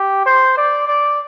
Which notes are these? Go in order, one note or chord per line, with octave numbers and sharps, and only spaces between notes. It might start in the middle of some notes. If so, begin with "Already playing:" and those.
Already playing: G4
C5
D5
D5